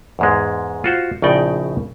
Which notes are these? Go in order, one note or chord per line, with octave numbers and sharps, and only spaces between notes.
E2 G#2 G#3
F4 F#4 C5
A#1 A2 C#3 D#4 D5 G5